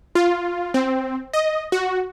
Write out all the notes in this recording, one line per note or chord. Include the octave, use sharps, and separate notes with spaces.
F4
C4
D#5
F#4